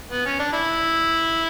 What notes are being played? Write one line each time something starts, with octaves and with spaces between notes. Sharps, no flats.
B3
C#4
D4
E4